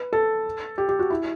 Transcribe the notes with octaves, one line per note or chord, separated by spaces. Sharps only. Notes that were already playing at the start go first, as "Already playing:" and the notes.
Already playing: B4
A4
G4
G4
F#4
E4